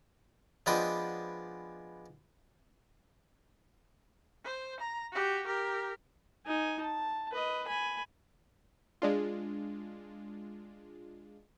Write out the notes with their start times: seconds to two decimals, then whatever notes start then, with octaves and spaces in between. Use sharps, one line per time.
0.66 F3 G#3 B3 D4 G5 D#6
4.44 C5
4.80 A#5
5.12 F#4 G4
5.47 G4 A#4
6.46 D#4 G#5
6.81 A5
7.32 B4 D#5
7.67 G#5 B5
9.02 G#3 D4 F4